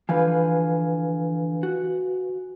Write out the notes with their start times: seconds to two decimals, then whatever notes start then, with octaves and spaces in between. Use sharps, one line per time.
0.09 D3 E3 F3 B4 F5 G#5
1.63 F#4